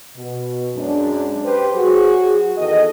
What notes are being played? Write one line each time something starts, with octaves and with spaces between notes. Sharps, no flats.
B2
F#2 G#3 D4
G4 B4 C5
F#3 F#4 G#4
E2 D#3 A4 D#5